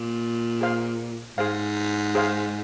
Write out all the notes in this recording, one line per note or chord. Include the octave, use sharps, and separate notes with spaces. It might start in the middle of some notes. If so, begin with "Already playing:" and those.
Already playing: A#2
G#4 C5 F5
G#2 G#4 C5 F5
G#4 C5 F5